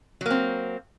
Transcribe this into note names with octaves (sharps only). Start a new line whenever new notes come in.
F#3 A#3 C4